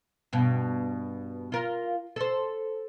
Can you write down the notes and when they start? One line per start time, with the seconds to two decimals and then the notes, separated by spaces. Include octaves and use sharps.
0.33 G2 B2
1.52 F4 A#4
2.16 A4 C5